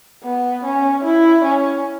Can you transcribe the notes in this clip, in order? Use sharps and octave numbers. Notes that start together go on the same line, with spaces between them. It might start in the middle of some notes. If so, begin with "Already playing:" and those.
B3
C#4
E4
C#4